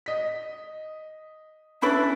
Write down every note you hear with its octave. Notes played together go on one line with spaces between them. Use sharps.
D#5 B6
C#4 D4 E4 B4 B5 A6